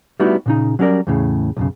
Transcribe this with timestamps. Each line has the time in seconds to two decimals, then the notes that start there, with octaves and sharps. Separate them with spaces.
0.20 G3 A3 B3 D#4 E4 F#4
0.46 A#2 C#3 D#4
0.79 F#3 G3 C#4 G4 A#4 D5
1.07 E2 A2 C#3
1.57 B1 F#2 C#3